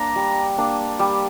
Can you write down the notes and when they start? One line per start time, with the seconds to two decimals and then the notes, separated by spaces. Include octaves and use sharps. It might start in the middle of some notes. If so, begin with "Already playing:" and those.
Already playing: A#3 D4 A#5
0.16 G3
0.58 A#3 D4
0.99 G3